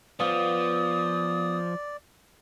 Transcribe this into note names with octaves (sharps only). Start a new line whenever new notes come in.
F3 B3 C#4 F4 D5 D#6